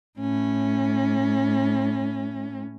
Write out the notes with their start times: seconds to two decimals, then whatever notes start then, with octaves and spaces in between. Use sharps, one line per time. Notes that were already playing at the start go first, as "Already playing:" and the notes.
0.20 A2 C#4